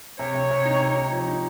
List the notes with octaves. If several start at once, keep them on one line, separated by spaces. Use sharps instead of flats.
C3 C#5
C3
C3
D#4
C3
D#4
F3
D#4